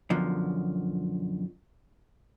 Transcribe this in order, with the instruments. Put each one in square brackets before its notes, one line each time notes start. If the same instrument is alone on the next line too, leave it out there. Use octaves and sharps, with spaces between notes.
[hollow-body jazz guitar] F#2 B2 D3 F3